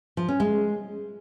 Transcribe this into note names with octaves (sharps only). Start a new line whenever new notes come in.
F3
C#4
G#3